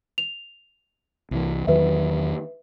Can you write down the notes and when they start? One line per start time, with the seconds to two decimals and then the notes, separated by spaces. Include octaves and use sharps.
0.18 F7
1.31 C2 E3
1.67 E2 D#3 F#3 B4 E5